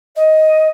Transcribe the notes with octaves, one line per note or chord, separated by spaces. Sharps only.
D#5